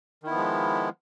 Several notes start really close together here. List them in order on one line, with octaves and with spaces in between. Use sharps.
D#3 E4 B3 F3 G#3